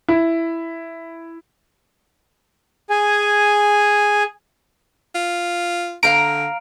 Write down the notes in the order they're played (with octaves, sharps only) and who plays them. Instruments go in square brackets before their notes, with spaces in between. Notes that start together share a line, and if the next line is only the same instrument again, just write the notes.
[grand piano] E4
[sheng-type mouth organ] G#4 G#5
[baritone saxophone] F4
[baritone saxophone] D3 [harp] F5 A#5 [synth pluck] D7